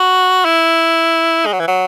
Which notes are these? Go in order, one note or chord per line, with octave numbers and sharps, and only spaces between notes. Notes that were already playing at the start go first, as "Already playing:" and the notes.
Already playing: F#4
E4
G#3
F#3
E3
F#3